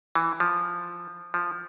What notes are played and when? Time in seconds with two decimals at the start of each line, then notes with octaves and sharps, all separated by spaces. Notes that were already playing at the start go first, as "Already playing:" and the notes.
0.15 E3
0.40 F3
1.34 F3